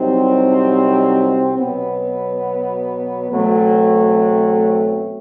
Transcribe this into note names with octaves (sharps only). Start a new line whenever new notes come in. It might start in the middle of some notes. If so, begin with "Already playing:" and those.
Already playing: C2 C3 F#3 C4 D#4
B2 F#3 B3
E2 B2 F#3 A3 C4